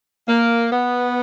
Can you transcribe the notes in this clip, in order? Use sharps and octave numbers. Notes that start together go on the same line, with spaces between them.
A#3
B3